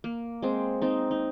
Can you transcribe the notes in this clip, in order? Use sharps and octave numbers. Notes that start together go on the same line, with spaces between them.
A#3
G#3 C4
C4 D#4
D#4